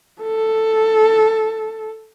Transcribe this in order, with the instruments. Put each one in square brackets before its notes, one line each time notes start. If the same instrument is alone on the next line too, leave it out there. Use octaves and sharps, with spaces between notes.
[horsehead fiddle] A4